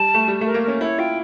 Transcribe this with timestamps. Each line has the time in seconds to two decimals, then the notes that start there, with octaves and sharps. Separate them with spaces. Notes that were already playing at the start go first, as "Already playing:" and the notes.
Already playing: G3 A5
0.14 A3
0.28 G3
0.41 A3 A#4
0.54 A#3
0.63 C#4 A#4
0.81 E4 C#5
0.98 F4 G5